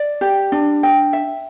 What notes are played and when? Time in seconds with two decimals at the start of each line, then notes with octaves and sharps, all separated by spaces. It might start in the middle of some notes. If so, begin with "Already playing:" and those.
Already playing: D5
0.21 G4
0.52 D4
0.83 G5
1.13 E5